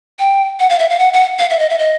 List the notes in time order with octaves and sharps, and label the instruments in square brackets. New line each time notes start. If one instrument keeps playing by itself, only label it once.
[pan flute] G5
F#5
F5
E5
F5
F#5
F#5
F5
E5
D#5
E5
D#5